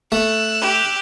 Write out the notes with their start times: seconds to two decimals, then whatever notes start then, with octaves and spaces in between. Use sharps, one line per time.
0.12 A3 E6 F#6
0.61 G4